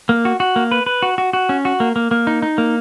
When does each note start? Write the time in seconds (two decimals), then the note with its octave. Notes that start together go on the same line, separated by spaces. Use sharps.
0.09 A#3
0.25 F#4
0.40 F#4
0.56 A#3
0.71 B4
0.86 B4
1.02 F#4
1.18 F#4
1.33 F#4
1.49 C#4
1.65 F#4
1.80 A#3
1.96 A#3
2.11 A#3
2.27 D#4
2.42 D#4
2.58 A#3